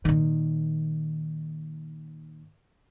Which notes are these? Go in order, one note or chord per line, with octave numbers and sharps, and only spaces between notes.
A#2 D#3